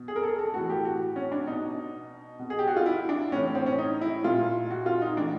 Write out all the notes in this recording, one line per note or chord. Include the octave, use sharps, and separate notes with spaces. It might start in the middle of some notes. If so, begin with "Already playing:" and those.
Already playing: B2
G#4
A#4
A4
A4
A2 E3 F#4
G4
F#4
C#4
D4
B2 D#4
B2
G#4
G4
F#4
F4
E4
D4
A2 E3 C#4
C#4
C4
C#4
D#4
E4
A#2 F4
F#4
F4
D#4
A2 E3 D4